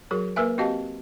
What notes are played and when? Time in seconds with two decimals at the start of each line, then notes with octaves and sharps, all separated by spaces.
0.11 F#3 F#4 G#4 A#4
0.36 A#3 A#4 B4 E5 G#5
0.58 C4 F#4 G4 D#5 F5 A5